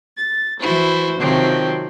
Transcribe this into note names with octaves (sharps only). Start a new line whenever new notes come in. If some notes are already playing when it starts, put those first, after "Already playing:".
A6
E3 E4 F#4 C5
C3 D#3 F3 F#3 C4